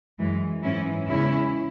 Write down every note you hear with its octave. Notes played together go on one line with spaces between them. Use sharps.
F#2 E3 G#3
G#2 E3 G#3 C#4 E4
E2 C#3 G#3 C#4 E4